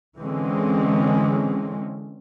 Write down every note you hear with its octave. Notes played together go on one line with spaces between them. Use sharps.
D3 E3 G#3 C4 C#4